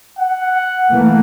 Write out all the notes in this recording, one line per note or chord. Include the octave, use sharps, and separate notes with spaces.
F#5
E3 A3 A#3